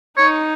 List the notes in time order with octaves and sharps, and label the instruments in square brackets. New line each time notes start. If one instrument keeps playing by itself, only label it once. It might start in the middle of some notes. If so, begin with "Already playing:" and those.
[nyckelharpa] D#4 [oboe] C#5